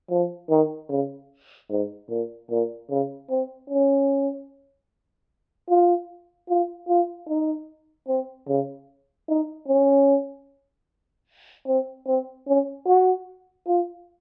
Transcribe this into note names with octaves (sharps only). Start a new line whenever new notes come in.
F3
D#3
C#3
G#2
A#2
A#2
C#3
C4
C#4
F4
F4
F4
D#4
C4
C#3
D#4
C#4
C4
C4
C#4
F#4
F4